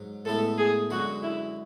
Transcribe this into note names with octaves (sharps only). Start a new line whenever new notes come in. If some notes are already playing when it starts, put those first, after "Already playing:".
Already playing: G#2 F#3
A2 G#3 B3 E4 A4
G#4
F#2 D3 G#3 F#4
E4